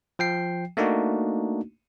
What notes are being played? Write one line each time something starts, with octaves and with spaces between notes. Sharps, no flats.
F3 G5 C7
A3 A#3 D4 D#4 F#4